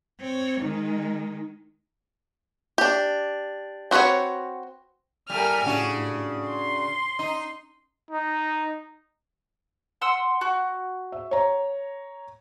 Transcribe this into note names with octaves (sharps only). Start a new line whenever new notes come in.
C4 C#5
D#3 G#3 D#4
D4 G4
C4 F#4 A4 B4 C#5
A2 G3 A#4 G#5 F6
A2 C#3 D4 F#4
C6
D#4
D#4
F#5 C6 E6
F#4
E5
C#5 A#5